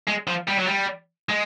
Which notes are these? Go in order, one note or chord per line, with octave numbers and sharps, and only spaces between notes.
G#3
F3
G3
F#3
G3
G#3